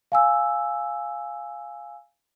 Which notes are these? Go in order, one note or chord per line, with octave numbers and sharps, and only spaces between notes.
F5 G#5 E6